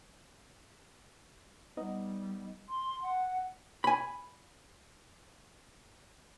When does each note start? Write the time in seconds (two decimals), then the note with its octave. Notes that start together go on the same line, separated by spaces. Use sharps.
1.77 G3 B3 D#4 D#5
2.69 C6
3.02 F#5
3.84 G#5 B5